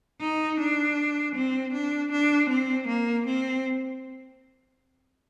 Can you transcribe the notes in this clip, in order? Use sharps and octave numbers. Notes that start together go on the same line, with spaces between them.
D#4
D4
C4
D4
D4
C4
A#3
C4